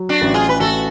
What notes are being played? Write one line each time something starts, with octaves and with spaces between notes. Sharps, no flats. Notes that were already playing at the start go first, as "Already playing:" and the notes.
Already playing: F#3
D4 F#4
A1
F4 G#4
B4
A1 F#4 A4